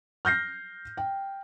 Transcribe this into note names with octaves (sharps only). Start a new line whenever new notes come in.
F6 G6 A#6 C7
G5